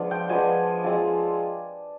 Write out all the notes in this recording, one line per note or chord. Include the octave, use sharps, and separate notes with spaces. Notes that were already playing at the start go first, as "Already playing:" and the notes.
Already playing: F3 G#3 B3 D4
G5
F3 G#3 B3 D4 G#5
F3 G#3 C4 F4